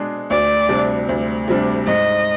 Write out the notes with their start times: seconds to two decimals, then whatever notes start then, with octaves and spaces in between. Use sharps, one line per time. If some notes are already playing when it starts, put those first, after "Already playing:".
Already playing: B2 G#3 D4 G#4
0.30 D2 D5
0.69 C3 G3 D4
1.09 D2
1.48 C3 G3 D4
1.87 G#2 D#5